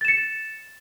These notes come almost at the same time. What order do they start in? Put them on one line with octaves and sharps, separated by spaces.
A6 E7 C#7